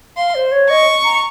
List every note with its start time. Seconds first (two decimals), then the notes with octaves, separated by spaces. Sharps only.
0.17 F5 C6
0.35 C5
0.52 C#5
0.70 D#5 C#6
1.05 A#5